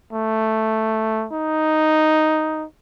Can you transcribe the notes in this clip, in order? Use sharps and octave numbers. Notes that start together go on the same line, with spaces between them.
A3
D#4